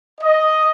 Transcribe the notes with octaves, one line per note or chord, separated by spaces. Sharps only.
D#5